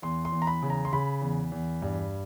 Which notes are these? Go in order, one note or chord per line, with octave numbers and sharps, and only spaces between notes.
E2 C6
C6
E2
A#5
B5
C#3
A#5
C6
C#3 B5
E2
E2
G2